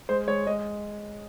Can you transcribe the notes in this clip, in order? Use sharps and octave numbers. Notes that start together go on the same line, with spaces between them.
G#3 C5
G#3 C#5
G#3 D#5